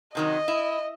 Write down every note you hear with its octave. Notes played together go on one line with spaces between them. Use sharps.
C3 D#3 F#3 D#5
E4